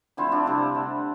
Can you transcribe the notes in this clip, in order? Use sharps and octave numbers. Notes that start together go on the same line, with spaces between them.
D3 F3 A3 C4 E4
D4 F4
C3 G3 C4 E4
D3 G3